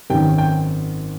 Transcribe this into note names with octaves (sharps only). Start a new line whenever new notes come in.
G#1 F#2 D#3 G4 G5
G5